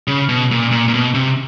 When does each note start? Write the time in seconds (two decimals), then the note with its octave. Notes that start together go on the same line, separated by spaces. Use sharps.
0.08 C#3
0.29 B2
0.51 A#2
0.71 A#2
0.88 A#2
0.94 B2
1.14 C3